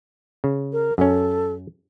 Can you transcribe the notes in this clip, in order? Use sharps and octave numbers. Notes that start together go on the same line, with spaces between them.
C#3
A#4
F#2 C#4 A4